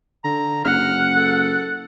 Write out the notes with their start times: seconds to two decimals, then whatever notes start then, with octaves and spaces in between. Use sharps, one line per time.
0.24 D3 A#5
0.65 F#1 F#5 F6
1.17 A4